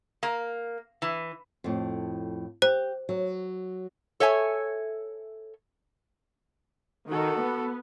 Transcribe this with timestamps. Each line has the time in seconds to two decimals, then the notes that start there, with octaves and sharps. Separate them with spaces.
0.23 A#3
1.02 E3
1.64 F2 A2
2.62 G4 C5
3.09 F#3
4.20 A4 C#5 E5 G#5
7.10 D#3 F#4 A4
7.41 B3